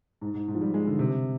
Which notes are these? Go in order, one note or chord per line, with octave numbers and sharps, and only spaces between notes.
G#2
G#2
G#2
F3
G3
G#3
D3
C3